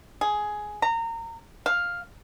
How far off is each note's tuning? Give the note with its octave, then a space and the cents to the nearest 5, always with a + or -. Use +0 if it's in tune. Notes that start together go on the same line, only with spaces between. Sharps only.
G#4 +10
A#5 -25
F5 +5